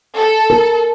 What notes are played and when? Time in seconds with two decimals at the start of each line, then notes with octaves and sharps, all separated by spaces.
0.17 A4
0.50 A#4